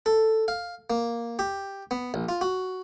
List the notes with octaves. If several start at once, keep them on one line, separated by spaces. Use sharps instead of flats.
A4
F5
A#3
G4
B3
A#1
F4
F#4